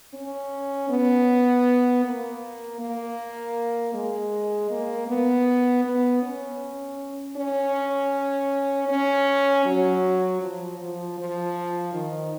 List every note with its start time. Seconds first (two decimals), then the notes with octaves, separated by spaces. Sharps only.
0.14 C#4
0.89 B3
2.04 A#3
2.80 A#3
3.94 G#3
4.71 A#3
5.08 B3
5.85 B3
6.22 C#4
7.36 C#4
8.89 C#4
9.65 F#3
10.41 F3
10.80 F3
11.18 F3
11.94 D#3